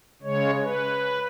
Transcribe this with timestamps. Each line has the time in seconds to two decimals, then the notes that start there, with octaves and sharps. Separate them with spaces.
0.22 C#3 G#3 C#5
0.63 B4